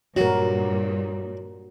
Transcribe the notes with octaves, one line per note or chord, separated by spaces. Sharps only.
G2 A#2 F#3 F#4 A#4